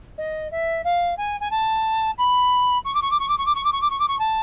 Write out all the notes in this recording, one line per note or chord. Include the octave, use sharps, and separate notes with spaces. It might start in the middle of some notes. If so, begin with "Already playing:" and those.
D#5
E5
F5
G#5
G#5
A5
B5
C#6
D6
C#6
D6
C#6
D6
C#6
D6
C#6
D6
C#6
D6
C#6
D6
C#6
A5